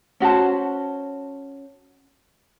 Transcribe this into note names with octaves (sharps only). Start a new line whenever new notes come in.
C#4 F#4 C5 A5